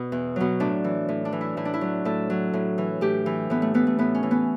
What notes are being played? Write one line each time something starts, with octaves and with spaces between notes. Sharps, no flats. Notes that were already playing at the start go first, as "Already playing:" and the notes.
Already playing: B2 F#4
E2
B2 F#3
A2 D4
E3
A2
D4
E3
E4
A2 E4
D4
E4
F#3
A2 A4
F#3
A2
E3
A2 G4
E3
A2 B3
A3
E3 B3
A3
A2 B3
C#4
E3
B3